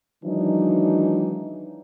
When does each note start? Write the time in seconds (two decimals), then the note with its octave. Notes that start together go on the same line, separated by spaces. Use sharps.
0.25 D#3 E3 F#3 G#3 D4 D#4